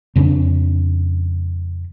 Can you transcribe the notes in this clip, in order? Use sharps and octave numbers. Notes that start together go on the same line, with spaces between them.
F2 C#3 C#4 D4